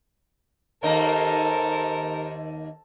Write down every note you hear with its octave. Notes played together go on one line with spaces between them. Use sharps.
D#2 A#3 D#4 A4 A#4 C5